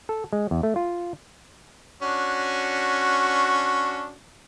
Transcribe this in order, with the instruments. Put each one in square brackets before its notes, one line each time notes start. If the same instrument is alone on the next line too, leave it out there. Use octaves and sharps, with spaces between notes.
[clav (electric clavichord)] A4
G#3
E2
A3
F4
[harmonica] C#4 D4 F#4